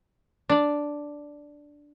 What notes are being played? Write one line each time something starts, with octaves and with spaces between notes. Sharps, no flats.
D4 D5